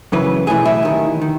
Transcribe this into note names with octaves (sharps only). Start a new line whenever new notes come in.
F#2 C#3 E3 B4
B1 A2 E3 G#4
E4
D#2 D#3
D#3